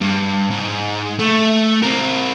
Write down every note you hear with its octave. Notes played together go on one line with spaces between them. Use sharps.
G2
G#2
A3
C4 A#4